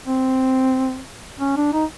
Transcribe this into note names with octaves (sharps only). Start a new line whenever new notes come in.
C4
C#4
D4
D#4